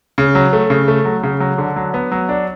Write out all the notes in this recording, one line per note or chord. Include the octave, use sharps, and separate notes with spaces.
C#3
F#3
A3
C#3
A3
F#3
C#3
F#3
D3
F#3
B3
F#3
D4